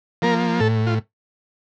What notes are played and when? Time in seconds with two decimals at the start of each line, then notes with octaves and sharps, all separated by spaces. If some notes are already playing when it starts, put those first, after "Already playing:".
0.22 F3 A#3 A#4
0.60 A2 A4
0.87 F4